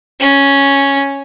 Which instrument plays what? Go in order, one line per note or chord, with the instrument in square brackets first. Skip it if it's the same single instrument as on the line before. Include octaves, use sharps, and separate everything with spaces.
[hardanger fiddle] C#4